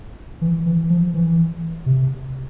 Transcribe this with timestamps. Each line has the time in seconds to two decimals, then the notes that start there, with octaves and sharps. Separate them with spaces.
0.41 E3
0.66 E3
0.90 F3
1.14 E3
1.86 C3